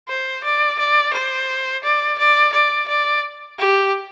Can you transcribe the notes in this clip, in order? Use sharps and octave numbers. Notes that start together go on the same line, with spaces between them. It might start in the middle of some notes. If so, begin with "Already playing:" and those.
C5
D5
D5
C5
D5
D5
D5
D5
G4